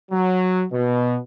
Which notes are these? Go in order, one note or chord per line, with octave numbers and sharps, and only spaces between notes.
F#3
B2